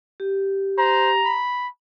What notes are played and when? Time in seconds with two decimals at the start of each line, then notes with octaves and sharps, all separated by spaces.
0.20 G4
0.78 C5 A#5
1.25 B5